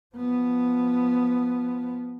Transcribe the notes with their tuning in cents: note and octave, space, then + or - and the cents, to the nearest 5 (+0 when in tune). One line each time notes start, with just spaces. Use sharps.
F3 +0 B3 +0